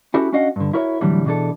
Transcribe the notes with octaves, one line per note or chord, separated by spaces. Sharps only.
C#4 E4 F#4 G4 A4
C#4 D4 F#4 D#5 F5 F#5
G2 D3
E4 F#4 A#4 C#5 E5
A2 D3 E3 F#3 G3
B2 E3 D4 G#4 A4